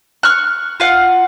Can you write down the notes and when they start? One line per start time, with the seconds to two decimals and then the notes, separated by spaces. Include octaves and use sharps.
0.23 C#6 F6 F#6
0.80 F4 F5 F#5